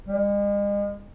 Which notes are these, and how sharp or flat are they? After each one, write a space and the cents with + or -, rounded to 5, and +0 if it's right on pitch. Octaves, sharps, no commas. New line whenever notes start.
G#3 -40